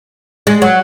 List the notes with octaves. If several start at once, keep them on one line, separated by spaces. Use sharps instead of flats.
G#3
F#3